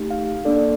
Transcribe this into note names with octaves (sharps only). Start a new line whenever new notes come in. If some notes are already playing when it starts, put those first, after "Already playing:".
Already playing: A3 D#4 G4
F5
A#3 D4 A4 D5